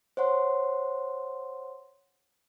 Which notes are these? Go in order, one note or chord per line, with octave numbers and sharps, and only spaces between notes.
C5 C#5 F#5 C6